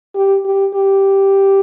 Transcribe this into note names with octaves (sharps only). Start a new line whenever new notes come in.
G4
G4
G4